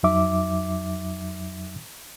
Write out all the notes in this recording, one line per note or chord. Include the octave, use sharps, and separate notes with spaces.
F2 F#3 D#4 E5 D6